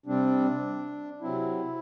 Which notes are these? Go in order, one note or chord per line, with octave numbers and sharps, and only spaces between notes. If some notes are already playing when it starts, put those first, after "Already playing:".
C3 G3 C4 D4
C3 F#3 C4 E4